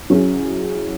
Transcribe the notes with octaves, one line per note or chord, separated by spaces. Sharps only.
F#3 C#4 E4 G#4